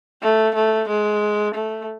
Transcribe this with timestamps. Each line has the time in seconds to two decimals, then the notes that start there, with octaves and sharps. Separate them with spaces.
0.22 A3
0.55 A3
0.88 G#3
1.54 A3